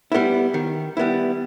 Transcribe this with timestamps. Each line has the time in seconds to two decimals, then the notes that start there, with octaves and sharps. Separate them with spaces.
0.12 G3 B3 E4
0.54 D#3
0.97 G3 B3 E4